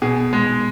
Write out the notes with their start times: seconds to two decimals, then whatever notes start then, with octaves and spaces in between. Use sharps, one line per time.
0.02 B2 G#4
0.33 G#3